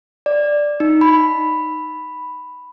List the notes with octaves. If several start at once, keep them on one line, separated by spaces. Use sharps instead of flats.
D5
D#4
B5